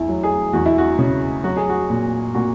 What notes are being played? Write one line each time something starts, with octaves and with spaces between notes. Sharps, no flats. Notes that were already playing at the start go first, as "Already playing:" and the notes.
Already playing: E2 E4
F#3
G#4
E2 F#4
E4
F#4
C#3
F#3 F#4
G#4
F#4
A#2
A#2 F#4